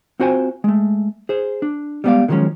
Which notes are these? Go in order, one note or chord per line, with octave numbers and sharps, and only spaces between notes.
C4 F4 F#4 C5 G5 G#5
G#3 A3
G#4 C5
D4
G3 G#3 B3 B4 D5 F5
D3 D#3 F3 F#3 G#3 C#4